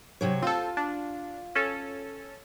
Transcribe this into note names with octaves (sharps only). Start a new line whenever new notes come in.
C3 F#3 C#5
C4 F4 A4
D4
C#4 A4